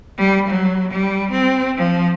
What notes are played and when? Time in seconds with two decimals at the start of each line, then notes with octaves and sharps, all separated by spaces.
0.18 G3
0.49 F#3
0.92 G3
1.31 C4
1.77 F3